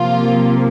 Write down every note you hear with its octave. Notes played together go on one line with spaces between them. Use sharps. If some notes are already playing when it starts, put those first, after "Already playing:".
Already playing: C3 F3 A#3 F4